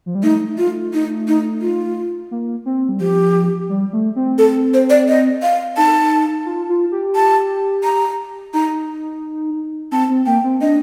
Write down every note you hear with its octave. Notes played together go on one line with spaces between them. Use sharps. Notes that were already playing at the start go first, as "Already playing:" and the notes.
F3
G3
A3 D#4
F4
D#4
D#4
F4
A#3
C4
G3
F3 G4
G3
A3
C4
A4
C5
D5
D#5
F5
D#4 A5
F4
F4
G4
A5
A#5
D#4 A#5
C4 A5
C4
A#3 G5
C4
D4 D#5